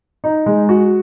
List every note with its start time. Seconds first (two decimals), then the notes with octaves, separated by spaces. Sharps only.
0.24 D#4
0.46 G#3
0.69 F#4